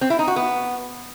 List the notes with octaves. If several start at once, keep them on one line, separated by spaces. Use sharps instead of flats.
C4
E4
D#4
F#4
B3